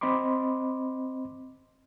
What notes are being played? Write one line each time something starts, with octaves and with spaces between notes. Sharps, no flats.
C4 D#5 B5 C6 D6